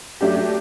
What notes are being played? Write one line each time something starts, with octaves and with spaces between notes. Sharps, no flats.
F#3 A3 D4 G4